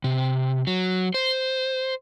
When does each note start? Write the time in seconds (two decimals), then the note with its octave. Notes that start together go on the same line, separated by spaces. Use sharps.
0.04 C3
0.67 F#3
1.14 C5